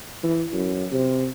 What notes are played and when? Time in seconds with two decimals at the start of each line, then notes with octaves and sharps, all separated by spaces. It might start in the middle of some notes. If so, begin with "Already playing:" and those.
0.23 E3
0.53 F#2
0.92 C3